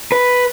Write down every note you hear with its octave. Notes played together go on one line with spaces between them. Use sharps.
B4